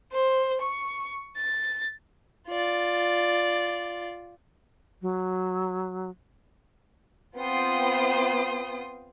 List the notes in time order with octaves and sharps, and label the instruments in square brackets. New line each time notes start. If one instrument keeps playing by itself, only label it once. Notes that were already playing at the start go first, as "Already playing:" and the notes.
[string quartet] C5
C#6
A6
[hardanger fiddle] F4 D5
[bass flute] F#3
[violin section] B3 C4 F4 G5 C6 D#6